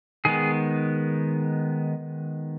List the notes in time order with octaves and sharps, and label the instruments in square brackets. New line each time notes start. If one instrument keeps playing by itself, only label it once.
[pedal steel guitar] D#3 G#3 B3 G#4